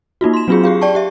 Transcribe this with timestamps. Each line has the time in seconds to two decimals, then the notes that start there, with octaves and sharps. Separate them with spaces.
0.21 A#3 D#4 F4 F#4
0.33 C6 E7
0.48 F#3 C4 D4 F4 F#4 G#4
0.64 G4 G#4 F5
0.81 D5 G5 A5 C#6
0.95 G4 E5